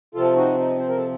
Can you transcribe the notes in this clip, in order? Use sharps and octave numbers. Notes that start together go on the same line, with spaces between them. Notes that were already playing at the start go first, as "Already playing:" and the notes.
C3 F3 C4 F4 A4
D#4 F#4
D#4
C5
A#4
A4